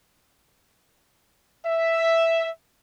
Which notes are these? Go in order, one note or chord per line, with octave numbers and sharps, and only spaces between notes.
E5